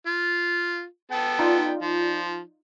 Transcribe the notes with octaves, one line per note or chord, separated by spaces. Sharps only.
F4
B3 A4 G5
D#4 F4 D5
F3